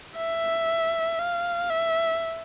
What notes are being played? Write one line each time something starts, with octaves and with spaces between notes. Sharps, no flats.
E5
F5
E5